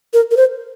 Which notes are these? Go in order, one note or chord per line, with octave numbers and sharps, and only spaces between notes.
A#4
A#4
C5